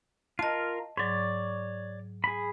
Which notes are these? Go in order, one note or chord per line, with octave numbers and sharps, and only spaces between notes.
F4 A#4 D#5 A5
G#2 F#3 C#5 D5
G#4 B5